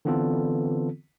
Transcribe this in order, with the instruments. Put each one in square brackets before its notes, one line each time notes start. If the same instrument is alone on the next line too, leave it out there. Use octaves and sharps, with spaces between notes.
[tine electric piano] D3 E3 B3 C4 F4 A4